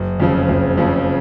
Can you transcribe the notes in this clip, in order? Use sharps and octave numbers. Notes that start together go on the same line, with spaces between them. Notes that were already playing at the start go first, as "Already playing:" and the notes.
Already playing: F#1
F2 C#3 F3
F#1
F2 C#3 F3